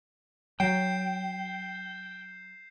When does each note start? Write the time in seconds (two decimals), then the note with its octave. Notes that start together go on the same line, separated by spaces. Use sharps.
0.60 F#3 G5 G6 C7 E7